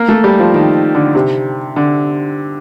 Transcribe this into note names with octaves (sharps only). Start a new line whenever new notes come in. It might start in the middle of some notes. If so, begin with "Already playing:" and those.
Already playing: A#3
A3
G3
F3
D#3
D3
C3
D3